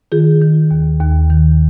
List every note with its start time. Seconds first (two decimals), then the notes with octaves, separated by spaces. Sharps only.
0.12 D#3 F4 G#4
0.41 D#3
0.71 D#2
1.00 D#2
1.30 D#3